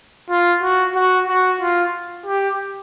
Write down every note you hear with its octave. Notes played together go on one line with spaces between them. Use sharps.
F4
F#4
F#4
F#4
F4
G4